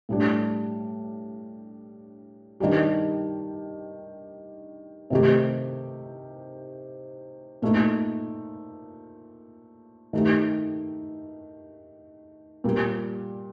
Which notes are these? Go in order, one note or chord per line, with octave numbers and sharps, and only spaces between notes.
A2 G3 D4
D#3 G3 D4 G4
C3 D#3 A3 D#4 G4
A#2 A3 D#4
D#3 A3 D#4 G4
A#2 G3 A#3